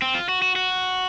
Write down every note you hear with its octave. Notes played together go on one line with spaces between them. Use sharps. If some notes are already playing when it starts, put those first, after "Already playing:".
C4
F4
F#4
F#4
F#4